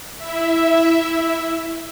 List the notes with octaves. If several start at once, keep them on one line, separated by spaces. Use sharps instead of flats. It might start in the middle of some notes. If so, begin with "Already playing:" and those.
E4 E5